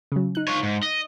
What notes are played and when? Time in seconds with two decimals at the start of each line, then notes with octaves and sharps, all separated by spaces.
0.12 C#3 F#3
0.35 D#4 F#6
0.48 F4 C#5
0.63 G#2
0.83 D#5